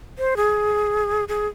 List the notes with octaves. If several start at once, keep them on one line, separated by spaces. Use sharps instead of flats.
C5
G#4
G#4